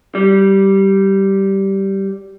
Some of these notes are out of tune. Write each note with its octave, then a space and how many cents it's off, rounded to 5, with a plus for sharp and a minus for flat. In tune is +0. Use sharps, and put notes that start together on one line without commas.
G3 -10